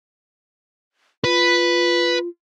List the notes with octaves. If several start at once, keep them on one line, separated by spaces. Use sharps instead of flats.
F4 B4